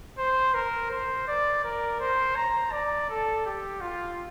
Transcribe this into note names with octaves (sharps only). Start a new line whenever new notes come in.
C5
A#4
C5
D5
A#4
C5
A#5
D5
A4
G4
F4